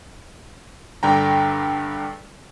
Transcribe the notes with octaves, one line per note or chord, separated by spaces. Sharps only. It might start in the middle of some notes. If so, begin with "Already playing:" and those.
G2 D3 G5 A#5